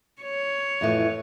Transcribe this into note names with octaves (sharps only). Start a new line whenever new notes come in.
C#5
F2 A2 E3